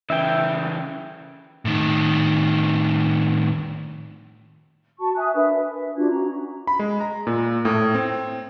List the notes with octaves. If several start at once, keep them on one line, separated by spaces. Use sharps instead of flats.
C#3 E3 E5 G5
A2 D#3
F#4 A5 C#6
E5 G#5 D#6 F#6
D4 A#4 B4 E5
B4 E5
D4 F4 F#4 G#6
C#4 F#4 A#5
B5
G#3
A#5
A#2
A2
C4